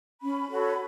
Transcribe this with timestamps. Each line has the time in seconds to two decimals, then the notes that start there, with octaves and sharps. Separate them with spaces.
0.21 C#4 B5
0.50 F#4 A4 C#5